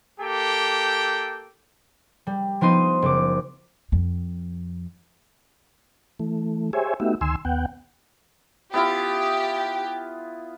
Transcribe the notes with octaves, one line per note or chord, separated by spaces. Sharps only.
A#3 G4 A4 G5
G3
F3 B3 D#4 C6 D#7
F#1 D6
F2
E3 A3
G4 G#4 C5 C#5 E5 G#5
A3 B3 D#4 F#4 G4 E5
D2 D#3 G#5 C6 E6
D#2 B3 F#5 G5
B3 E4 F4 G4